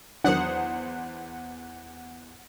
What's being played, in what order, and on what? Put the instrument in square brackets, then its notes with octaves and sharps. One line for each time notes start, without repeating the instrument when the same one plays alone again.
[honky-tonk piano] E2 C5 D#6 [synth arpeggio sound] D#3 F#3 D4 [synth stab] F#5